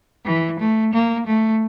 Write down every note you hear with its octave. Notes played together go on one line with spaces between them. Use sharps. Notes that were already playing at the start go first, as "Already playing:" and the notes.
E3
A3
A#3
A3